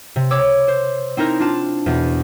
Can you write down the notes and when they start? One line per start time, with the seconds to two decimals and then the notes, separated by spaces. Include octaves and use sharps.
0.16 C3
0.31 C#5 D6 E6
0.68 C5
1.17 C4 D#4 E4 A#4
1.40 D4 F4 A5
1.86 E2 B2